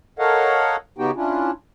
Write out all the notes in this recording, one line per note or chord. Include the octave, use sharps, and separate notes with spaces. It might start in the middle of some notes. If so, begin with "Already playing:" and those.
A4 A#4 C#5 D#5 F5 F#5
C#3 B3 D#4 F#4 G4 G5
C#4 D4 E4 F4